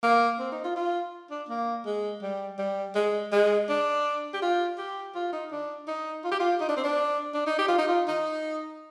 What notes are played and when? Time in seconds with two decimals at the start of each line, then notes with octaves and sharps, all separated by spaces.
0.03 A#3
0.39 C4
0.52 D#4
0.64 F4
0.76 F4
1.31 D4
1.49 A#3
1.86 G#3
2.23 G3
2.59 G3
2.95 G#3
3.32 G#3
3.69 D4
4.34 G4
4.42 F4
4.78 G4
5.15 F4
5.33 D#4
5.51 D4
5.88 D#4
6.24 F4
6.32 G4
6.40 F4
6.61 D#4
6.69 D4
6.77 C4
6.84 D4
7.34 D4
7.47 D#4
7.59 G4
7.68 F4
7.78 D#4
7.88 F4
8.08 D#4